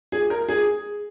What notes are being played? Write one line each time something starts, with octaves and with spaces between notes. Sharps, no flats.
G#4
A#4
G#4